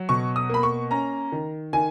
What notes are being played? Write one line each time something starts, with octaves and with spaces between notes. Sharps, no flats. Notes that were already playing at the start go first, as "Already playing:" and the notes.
Already playing: F#3
B2 C#6
D#6
A#3 B5
C#6
C#4 A#5
D#3
D#3 G#5